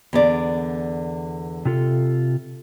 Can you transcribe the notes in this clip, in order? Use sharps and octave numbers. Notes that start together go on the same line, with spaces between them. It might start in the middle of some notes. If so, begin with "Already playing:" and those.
E2 D3 D5
C3 F4 A4